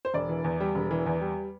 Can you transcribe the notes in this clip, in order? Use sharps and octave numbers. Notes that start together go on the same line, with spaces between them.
C5
E1 D5
E3
E2
G3
E1
E3
E2
G3